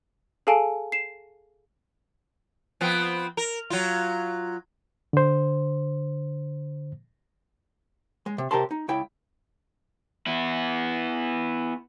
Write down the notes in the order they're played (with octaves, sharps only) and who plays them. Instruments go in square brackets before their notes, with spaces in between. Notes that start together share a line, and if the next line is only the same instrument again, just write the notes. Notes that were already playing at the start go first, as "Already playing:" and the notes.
[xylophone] G#4 A4 F5 G#5 A5 D7
C7 E7
[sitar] F3 B3 C4
A#4
F#3 F4
[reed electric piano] D3 C5
[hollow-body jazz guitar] G#3
C3
C3 G4 A#4 A5 C6
D#4
C#2 E4 G5
[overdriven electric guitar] B3 E4